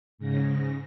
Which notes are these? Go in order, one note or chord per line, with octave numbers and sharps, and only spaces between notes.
G#2 C#3 A#6